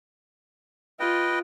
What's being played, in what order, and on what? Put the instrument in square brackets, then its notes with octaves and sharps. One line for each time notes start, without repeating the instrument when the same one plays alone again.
[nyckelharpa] F4 [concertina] B4 D#5 G5